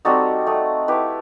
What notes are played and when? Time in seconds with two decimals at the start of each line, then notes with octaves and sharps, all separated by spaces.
0.05 G3 C4 D#4 F#4 A4
0.47 A3 D#4
0.88 A3 E4 G4 B4